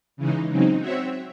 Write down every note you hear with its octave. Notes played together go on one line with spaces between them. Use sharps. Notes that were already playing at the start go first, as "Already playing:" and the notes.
C#3 E3 G#3 D#4
C#3 F#3 C4 D#4
C4 F#4 C#5 E5